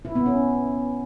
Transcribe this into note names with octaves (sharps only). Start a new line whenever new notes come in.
E4
B3
C#4